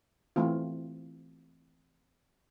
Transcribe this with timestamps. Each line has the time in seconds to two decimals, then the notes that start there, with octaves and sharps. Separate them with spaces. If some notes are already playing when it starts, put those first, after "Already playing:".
0.36 E3 A3 C4 F4